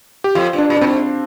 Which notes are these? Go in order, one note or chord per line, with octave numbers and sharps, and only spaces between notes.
G4
F2 F4
G2
D4
A#2
D4
A#2 C4
G#2